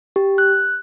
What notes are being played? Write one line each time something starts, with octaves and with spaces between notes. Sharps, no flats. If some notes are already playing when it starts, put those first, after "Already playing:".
G4
F#6